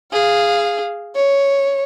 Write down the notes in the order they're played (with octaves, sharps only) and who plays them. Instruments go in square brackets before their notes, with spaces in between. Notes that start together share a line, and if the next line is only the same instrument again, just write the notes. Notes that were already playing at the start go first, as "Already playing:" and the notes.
[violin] G#4 F5
C#5